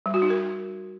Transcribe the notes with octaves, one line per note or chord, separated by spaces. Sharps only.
G3
F#4
D#4
A#4